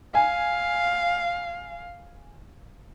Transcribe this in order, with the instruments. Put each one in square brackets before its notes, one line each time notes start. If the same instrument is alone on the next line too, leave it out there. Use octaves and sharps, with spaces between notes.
[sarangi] F5 [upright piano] G#5